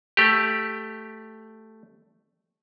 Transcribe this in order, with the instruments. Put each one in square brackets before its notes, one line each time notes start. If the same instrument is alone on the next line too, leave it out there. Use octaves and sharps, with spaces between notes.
[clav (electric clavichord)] A3 G4